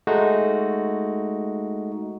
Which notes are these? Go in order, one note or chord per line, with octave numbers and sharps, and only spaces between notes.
G#3 A3 D#4 F#4